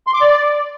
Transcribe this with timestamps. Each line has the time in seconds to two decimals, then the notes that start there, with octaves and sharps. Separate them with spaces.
0.07 C6
0.14 D6
0.21 D5